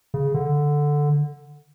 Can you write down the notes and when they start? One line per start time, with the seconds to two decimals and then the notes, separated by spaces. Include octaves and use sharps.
0.14 C#3
0.34 D3